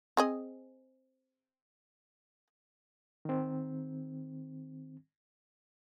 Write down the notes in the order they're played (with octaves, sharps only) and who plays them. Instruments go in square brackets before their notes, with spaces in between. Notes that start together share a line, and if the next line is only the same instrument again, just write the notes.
[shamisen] C4 G#4 D#5
[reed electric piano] D#3 C4